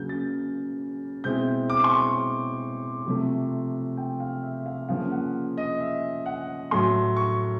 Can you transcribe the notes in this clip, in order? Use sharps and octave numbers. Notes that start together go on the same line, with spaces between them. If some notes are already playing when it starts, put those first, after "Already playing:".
Already playing: C#3 F#3 A#3 G6
A6
B2 G#3 C4 E4 G6
D6
C6
C#6
C3 F3 A3
G5
F5
E5
F5
C#3 F3 A#3 C#4 F5
F#5
D#5
E5
F#5
A2 F#3 A3 C6
C#6